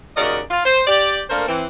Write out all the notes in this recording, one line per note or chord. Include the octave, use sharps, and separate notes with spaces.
D#2 C#3 F#4 A#4 D5 D#5
F4
C5
G4 D5
A3 A#3 D4 A#4 C5
E3 C4